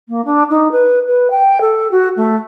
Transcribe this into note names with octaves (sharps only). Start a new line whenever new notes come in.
A#3
D4
D#4
B4
B4
G5
A4
F#4
A3